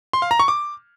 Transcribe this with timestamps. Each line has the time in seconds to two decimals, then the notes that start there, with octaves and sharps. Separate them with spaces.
0.13 C6
0.22 F5
0.31 A#5
0.40 C#6
0.48 D6